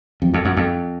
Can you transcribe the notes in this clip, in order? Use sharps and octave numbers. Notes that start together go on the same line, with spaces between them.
F2
F2
F#2
F2